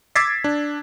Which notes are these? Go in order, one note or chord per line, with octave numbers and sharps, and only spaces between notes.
D6 E6 G#6 A6 B6 C7
D4